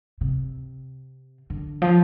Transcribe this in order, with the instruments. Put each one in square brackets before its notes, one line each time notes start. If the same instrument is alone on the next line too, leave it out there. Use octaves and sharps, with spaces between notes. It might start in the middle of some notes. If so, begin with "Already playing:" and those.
[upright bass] C3
D3
F3